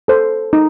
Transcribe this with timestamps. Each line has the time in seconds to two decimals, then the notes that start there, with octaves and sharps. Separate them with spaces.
0.08 A4 C5
0.53 D#4